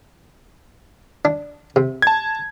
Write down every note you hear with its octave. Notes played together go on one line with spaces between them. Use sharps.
D4
C3
A5 G#6